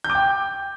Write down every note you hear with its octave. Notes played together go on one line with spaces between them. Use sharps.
G6
D6
G5